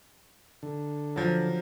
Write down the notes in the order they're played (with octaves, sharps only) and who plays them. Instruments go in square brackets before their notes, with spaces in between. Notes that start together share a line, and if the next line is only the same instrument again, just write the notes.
[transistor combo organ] D3
[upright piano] F3 F#3